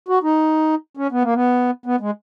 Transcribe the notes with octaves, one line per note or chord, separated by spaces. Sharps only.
F#4
D#4
C#4
B3
A#3
B3
B3
G#3